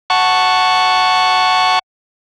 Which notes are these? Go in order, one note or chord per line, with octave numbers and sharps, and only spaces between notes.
F#5 A5 C#6